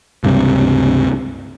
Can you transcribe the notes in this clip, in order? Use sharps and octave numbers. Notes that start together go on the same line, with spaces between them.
C#2 G2 C3